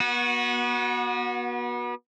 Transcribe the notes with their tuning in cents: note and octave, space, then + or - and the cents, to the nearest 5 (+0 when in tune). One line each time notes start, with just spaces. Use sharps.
B3 -35 F#4 -10